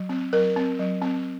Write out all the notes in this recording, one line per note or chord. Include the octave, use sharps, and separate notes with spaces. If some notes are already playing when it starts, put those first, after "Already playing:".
Already playing: F#3
C4
F#3 A#4
C4
F#3
C4